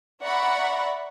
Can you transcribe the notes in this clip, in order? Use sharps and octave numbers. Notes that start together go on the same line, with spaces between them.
D5 E5 F#5 A#5 B5 C#6